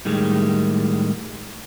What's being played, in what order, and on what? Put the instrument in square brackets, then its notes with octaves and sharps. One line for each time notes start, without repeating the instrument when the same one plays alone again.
[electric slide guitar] A2 D#3 G3 G#3